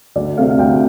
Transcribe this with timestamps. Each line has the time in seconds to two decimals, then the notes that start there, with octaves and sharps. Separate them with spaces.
0.16 D2 D5
0.38 C3 A3 C4 F5
0.50 F5
0.59 D2 G5